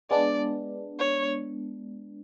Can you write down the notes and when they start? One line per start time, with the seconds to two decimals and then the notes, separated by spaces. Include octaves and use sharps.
0.10 G#3 B3 D4 D5
0.99 C#5